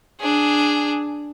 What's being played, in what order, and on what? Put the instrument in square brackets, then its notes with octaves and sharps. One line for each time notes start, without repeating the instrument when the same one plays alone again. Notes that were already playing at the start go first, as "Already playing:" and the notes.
[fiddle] D4 G#4